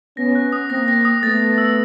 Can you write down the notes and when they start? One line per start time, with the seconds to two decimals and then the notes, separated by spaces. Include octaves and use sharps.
0.17 B3 C#4 A#6
0.35 F#6
0.53 D#6
0.70 A#3 C4 A#6
0.88 A#6
1.05 D#6
1.23 A3 B3 A6
1.40 A6
1.58 E6